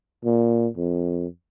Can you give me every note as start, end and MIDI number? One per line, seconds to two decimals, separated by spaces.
0.24 0.67 46
0.77 1.27 41